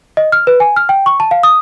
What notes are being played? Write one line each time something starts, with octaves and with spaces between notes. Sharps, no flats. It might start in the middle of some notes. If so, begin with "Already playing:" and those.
D#5
F6
B4
G#5
F6
G5
C#6
A5
F5
D#6